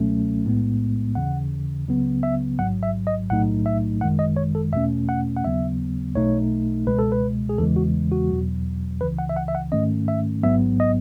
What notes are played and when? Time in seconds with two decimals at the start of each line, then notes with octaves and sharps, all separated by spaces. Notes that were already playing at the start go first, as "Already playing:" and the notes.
Already playing: C#2 B2 F#3 A3 C#4
0.45 B1 A2 G#3 B3
1.15 D#2 C#3 E3 F#5
1.88 C#2 C#3 F#3 B3
2.23 E5
2.59 A1 G#2 F#3 F#5
2.83 E5
3.07 D#5
3.30 B1 A2 F#3 A3 D#4 F#5
3.66 E5
4.01 G#1 F#2 D#3 G#3 F#5
4.19 D#5
4.36 C#5
4.55 A4
4.73 E2 B2 A3 C#4 E5
5.09 F#5
5.37 F#5
5.44 D#2 C#3 F#3 B3 E5
6.16 B1 B2 A3 D#4 C#5
6.87 C#2 B2 G#3 B4
6.99 A4
7.12 B4
7.49 G#4
7.58 E2 C#3 E3 G#3 A4
7.76 F#4
8.12 F#4
8.30 E2 B2 F#3
9.01 C#2 C#3 E3 B4
9.19 F#5
9.29 E5
9.36 F#5
9.48 E5
9.55 F#5
9.72 G#2 D#3 A3 C#4 D#5
10.08 E5
10.43 A1 G#2 F#3 B3 E5
10.80 D#5